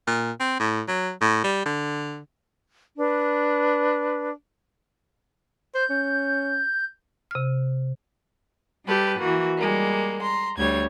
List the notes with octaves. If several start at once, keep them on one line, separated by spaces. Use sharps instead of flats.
A#2
C4
A2
F#3
A2
G3
D3
D4 B4
C5 G6
C#4
C3 F6
G3 G4 A4 B4
E3 A#3 F#4
G3 G#3 A#3
A#5 C6
D2 G3 C#5 G#6